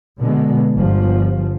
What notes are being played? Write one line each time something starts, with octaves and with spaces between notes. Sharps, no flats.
B2 D3 G#3 B3
G1 F3